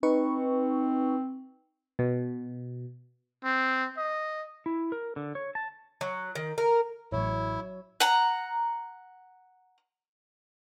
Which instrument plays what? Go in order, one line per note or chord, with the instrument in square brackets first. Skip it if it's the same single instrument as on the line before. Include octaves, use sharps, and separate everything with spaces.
[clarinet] C4 [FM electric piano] D#4 B4 C#6
[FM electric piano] B2
[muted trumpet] C4
D#5
[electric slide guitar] E4
A#4
D3
C#5
A5
[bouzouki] F#3
D#3
A#4
[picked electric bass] A1 A2 [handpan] F#3 C#5 [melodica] E4
[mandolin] F#5 A#5